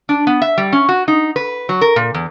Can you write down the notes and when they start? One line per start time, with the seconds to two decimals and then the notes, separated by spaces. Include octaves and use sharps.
0.09 D4
0.27 B3
0.42 E5
0.58 G3
0.72 C#4
0.89 F#4
1.08 D#4
1.36 B4
1.69 F#3
1.81 A#4
1.96 A#2
2.14 E2